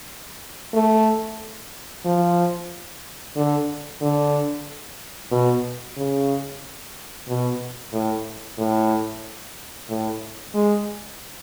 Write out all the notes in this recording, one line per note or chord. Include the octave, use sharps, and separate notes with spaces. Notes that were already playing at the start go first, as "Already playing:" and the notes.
A3
F3
D3
D3
B2
C#3
B2
A2
A2
A2
G#3